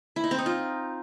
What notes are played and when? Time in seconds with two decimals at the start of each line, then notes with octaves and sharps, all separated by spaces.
0.16 E4
0.24 D#4
0.31 C4
0.38 D#4
0.46 F4